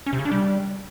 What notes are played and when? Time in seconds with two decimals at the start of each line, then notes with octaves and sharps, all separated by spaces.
0.06 C#4
0.13 C3
0.19 C#3
0.25 D4
0.32 G3